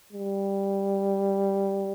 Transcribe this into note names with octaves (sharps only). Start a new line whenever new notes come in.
G3